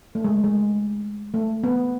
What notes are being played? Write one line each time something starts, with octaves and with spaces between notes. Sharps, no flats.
A3
G#3
G#3
A3
B3